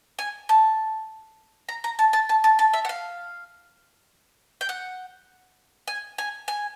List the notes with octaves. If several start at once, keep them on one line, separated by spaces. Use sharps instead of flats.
G#5
A5
A#5
A#5
A5
A5
A5
A5
A5
E5
F#5
F5
G5
F#5
G#5
G#5
G#5